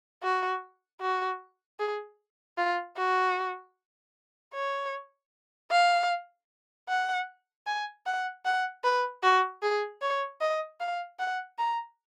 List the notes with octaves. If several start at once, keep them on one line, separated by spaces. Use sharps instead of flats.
F#4
F#4
G#4
F4
F#4
C#5
F5
F#5
G#5
F#5
F#5
B4
F#4
G#4
C#5
D#5
F5
F#5
A#5